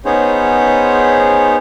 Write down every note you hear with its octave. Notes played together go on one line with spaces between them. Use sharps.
B3 C#4 D#4 G#4 C5 C#5